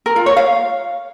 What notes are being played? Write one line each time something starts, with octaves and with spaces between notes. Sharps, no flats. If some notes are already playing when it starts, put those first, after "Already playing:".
A#4
F4
C#5
F5